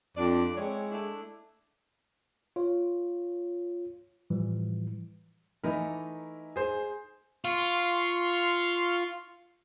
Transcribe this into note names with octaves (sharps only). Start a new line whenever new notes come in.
F2 D4 D5
G#3 C4 E4 C#5
A3 D4 E4
F4 C#5
A2 E3 F3 G3
E3 A3 D#4 E4 A#4
G#4 C5
F4 C6 C#6 F6